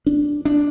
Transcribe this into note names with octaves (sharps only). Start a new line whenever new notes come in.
D4
D4